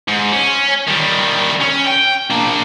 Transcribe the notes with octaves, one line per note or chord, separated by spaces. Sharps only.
G#2
C#4
D#3 G3
C#4
G5
A#3 D4